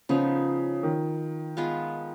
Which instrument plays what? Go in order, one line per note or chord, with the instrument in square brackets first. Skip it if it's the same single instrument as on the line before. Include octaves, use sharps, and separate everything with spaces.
[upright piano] C#3 [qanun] F3 B3 D#4
[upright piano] D#3
[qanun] G#3 B3 F4 B4